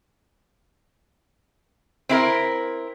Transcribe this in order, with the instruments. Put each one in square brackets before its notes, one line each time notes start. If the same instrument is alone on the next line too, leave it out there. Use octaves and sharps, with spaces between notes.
[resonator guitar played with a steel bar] C4 E4 A#4